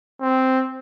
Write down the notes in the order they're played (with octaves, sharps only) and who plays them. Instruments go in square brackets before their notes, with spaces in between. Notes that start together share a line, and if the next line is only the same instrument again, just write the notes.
[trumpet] C4